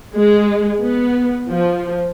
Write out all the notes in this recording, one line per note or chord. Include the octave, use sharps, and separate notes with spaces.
G#3
B3
F3